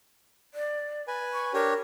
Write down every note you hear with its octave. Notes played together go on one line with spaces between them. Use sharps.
D5
B4 G#5
C#6
D4 G4 A#4 C#5